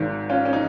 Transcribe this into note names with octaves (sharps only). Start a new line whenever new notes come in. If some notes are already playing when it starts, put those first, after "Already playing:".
Already playing: G#1 G#2 D#3
C#4 F4
C#4
D#4